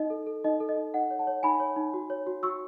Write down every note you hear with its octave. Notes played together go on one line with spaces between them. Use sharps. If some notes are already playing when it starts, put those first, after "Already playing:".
Already playing: D#4 D#5
A4
A4
D#4 D#5
A4
D#5
D#4
D#4 D#5 F#5
C#5
F#5 A5
C#5
D#4 G#5 B5
C#5
D#4
F#4
C#5
F#4
F#4 C#6 E6